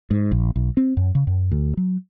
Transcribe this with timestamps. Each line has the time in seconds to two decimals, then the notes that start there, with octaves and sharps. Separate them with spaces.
0.11 G#2
0.31 A#1
0.56 B1
0.77 C4
0.97 F#2
1.15 C#3
1.27 F#2
1.51 D2
1.77 F#3